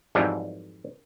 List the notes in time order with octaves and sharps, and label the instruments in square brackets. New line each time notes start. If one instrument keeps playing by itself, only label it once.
[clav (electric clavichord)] F2 G#2 E3 F#3 G3